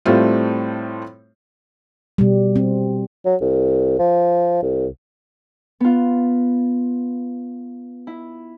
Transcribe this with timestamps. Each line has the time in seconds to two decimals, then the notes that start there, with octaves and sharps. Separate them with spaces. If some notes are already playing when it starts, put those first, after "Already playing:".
0.06 A2 G3 A3 C4 F4
2.18 B2 G3
2.56 C4
3.25 F#3
3.41 C2
3.99 F3
4.62 C2
5.80 B3 F4
8.07 E4